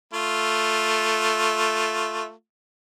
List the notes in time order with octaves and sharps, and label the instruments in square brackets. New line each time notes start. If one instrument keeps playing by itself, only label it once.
[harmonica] A3 F4